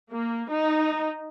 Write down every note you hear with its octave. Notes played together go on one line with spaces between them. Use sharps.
A#3
D#4